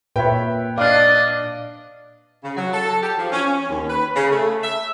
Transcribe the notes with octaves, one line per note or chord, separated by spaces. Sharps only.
A#2 B4 C#5 E5 G5
D4 D5 D#5 F5 D6 F#6
C#3
F#3
A4
G4
F3
C#4
C#4
D#2
B4
C#3
A3
E5